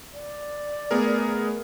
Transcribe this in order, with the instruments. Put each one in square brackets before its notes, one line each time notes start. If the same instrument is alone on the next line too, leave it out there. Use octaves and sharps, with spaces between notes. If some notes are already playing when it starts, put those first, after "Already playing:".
[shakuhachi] D5
[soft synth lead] A3 [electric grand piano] B3 G#4 A#4